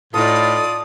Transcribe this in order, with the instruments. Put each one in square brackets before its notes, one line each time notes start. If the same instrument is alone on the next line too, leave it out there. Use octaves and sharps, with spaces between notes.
[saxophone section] A2 [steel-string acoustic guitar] D#4 A4 [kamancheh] F4 D5 [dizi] D#6